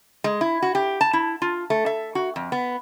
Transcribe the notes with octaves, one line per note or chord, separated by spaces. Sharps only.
G#3
E4
F#4
G4
A5
E4
F4
A3
E5
F#4
F2
B3